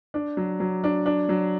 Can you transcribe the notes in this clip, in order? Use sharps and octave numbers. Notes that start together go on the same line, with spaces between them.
D4
F#3
F#3
D4
D4
F#3